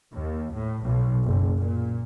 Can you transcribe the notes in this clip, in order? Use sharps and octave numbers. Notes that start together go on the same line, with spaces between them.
D#2
A2
B1
F#1
A#2